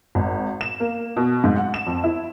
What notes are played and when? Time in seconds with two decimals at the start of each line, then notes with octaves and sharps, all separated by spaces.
0.15 G#1
0.61 E7
0.80 A#3
1.16 B2
1.44 G#2
1.56 F#5
1.74 E7
1.87 F2
2.04 E4